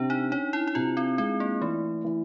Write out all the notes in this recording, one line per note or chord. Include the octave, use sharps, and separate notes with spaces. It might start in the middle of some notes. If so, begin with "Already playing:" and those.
Already playing: C3 D4
D#4
C#4 D#4
E4
E4
C3 F4
C4
G#3 C4
A#3
E3 A3
E3